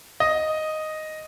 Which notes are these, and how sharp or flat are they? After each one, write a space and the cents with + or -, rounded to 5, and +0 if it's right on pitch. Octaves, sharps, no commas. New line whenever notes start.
D#5 +0